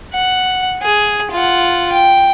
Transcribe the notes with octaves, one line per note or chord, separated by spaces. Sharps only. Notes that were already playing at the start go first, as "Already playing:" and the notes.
F#5
G#4
F4 F#5
G5